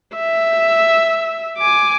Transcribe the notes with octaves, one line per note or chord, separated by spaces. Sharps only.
E5
G#5 D6